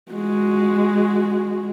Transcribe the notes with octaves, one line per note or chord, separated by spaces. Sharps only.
G#3 F#4